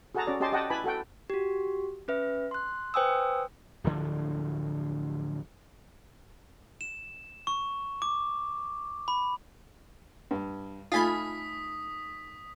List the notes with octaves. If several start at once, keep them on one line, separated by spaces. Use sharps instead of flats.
F#4 G#4 A4 F#5 A5 A#5
C#4 F#4 D5
C#4 G4 D#5 A5 C6
G4 D#5 F#5 G5 A5
E4 B4 G#5 A5 B5
F#4 A4 F#5 G5
F#4 G4
C#4 B4 E5
C6 F#6
B4 C5 G5 G#5 D#6 E6
D1 D2 D3 F3
E7
C#6
D6
B5
G2
A3 D#4 F4 G#5 B5 D#6 B6